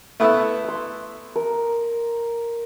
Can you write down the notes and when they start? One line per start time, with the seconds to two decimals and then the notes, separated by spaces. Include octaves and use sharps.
0.20 A3 B3 E4
0.64 C6 D6
1.36 A#4